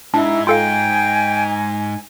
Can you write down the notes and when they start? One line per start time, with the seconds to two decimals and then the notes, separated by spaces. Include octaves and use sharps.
0.14 G#2 D4 E4
0.47 F4 A4 F5 G5 G#5